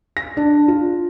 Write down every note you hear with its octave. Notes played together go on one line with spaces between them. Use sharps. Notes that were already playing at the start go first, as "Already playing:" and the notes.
A#6
D4
F4